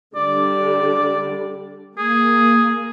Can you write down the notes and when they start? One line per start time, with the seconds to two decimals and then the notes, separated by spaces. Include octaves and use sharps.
0.16 D3 G3 D5
1.98 A#3 G#4